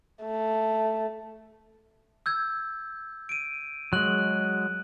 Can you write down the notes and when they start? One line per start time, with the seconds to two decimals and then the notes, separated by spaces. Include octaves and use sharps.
0.24 A3
2.26 E6 G6 G#6
3.29 D7 D#7
3.93 F#3 G#3 F#6 F#7